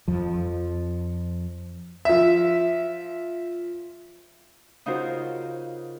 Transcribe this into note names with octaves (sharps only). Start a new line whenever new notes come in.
F2 F3
F3 E5
C#3 D#4 F4 F#4 A#4 C5